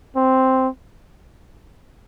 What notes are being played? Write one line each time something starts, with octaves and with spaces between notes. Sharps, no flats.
C4